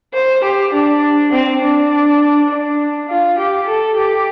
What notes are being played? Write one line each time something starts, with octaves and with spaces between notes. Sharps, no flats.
C5
G4
D4
C4
D4
D4
F4
G4
A4
G4